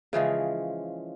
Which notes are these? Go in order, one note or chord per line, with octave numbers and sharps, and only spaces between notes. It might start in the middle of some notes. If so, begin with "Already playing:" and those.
C#3 E3 F3 G#3